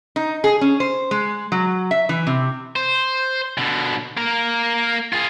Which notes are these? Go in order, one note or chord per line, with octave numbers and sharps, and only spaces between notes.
D#4
G#4
C#4
C5
G#3
F#3
E5
E3
C3
C5
B2 D3
A#3 A#4
F4 G#4